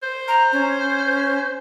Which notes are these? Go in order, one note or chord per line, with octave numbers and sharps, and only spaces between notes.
C5
A#5
C#4